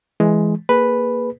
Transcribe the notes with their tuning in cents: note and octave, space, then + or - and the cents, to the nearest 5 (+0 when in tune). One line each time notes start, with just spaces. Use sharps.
E3 +5 G#3 +5
A#3 +0 G#4 +0 B4 +0